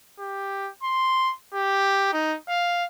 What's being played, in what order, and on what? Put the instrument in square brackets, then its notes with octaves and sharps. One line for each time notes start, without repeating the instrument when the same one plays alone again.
[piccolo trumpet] G4
C6
G4
D#4
F5